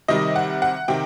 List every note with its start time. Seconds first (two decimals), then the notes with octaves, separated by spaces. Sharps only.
0.08 C3 D#3 G3 D#5
0.36 F#5
0.62 F#5
0.88 C3 D#3 G5